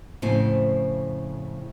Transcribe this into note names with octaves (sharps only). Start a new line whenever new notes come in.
F2 A2 C#3 C4 E4 G#5